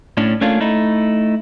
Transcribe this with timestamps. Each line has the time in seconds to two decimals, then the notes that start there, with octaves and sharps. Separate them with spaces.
0.17 A2 C#4 D4
0.41 A3 A#3 C#4 D4 F4
0.60 A3 D#4 E4